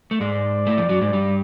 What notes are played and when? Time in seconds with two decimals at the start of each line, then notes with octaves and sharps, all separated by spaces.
0.11 A3
0.20 G#2 G#3 D5
0.67 A2 A3
0.78 F2 F3
0.89 F#2 F#3
1.01 G#2 G#3
1.13 G2 G3